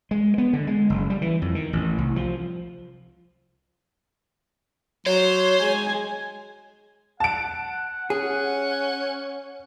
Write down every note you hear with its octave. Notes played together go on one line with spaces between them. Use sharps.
G#3
B3
D3
G#3
F#1
G3
E3
F2
D#3
A1
C2
F3
F#3 C5 C#5
G#3 G#5
F#5 A5 D7
C#4 G#4